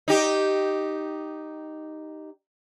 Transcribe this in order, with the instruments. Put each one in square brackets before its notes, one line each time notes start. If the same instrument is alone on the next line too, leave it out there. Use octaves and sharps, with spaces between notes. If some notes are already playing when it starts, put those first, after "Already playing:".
[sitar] D#4 G4